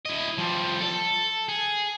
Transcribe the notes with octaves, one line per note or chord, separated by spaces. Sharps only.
E4 D#5
F3 G3
A4
G#4